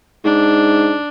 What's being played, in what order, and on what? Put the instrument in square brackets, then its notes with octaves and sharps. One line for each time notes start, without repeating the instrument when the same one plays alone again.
[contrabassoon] G#2 [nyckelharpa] D4